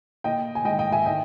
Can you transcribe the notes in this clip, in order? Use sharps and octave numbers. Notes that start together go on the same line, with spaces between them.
A#2 D#5 G5
G#5
G#2 D#3 D#5 G5
D#5 G5
E5 G#5
D#3 D#5 G5